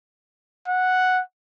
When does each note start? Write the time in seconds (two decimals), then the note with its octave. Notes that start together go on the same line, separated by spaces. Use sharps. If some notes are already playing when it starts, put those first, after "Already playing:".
0.68 F#5